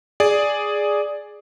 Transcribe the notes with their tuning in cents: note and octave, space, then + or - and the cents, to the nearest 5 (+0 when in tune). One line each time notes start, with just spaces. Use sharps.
G#4 +0 D5 +0